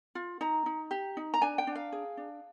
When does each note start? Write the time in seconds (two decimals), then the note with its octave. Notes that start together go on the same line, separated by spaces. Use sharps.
0.15 F4
0.41 D#4 A#5
0.66 D#4
0.91 G4
1.17 D#4
1.34 A#5
1.42 D4 G#5
1.58 G5
1.67 D4
1.75 F5
1.92 G#4
2.17 D4